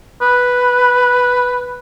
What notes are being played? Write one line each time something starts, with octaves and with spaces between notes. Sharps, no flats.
B4